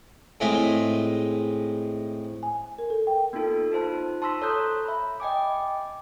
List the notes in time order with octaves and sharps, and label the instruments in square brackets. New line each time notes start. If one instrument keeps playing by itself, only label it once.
[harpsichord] A2 G#3 C4 F4 E5 G#5
[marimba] G#5
A#4
A4
G5
[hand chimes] A#3 B3 D#4 F4 A4
D#4 F4 C5 A5
A5 C6 C#6 E6 A#6 B6
A4 C#5 A#5 D#6 F#6 G6
E5 B5
D#5 G5 G#5 D6